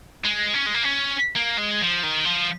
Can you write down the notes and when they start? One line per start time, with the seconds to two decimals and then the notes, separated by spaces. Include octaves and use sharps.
0.24 G#3
0.54 C#4
0.66 G#3
0.74 A#3
0.84 C#4
1.36 A#3
1.58 G#3
1.81 F3
2.03 D#3
2.25 F3